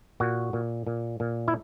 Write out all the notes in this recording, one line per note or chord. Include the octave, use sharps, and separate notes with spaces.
A#2 F#4
A#2
A#2
A#2
E4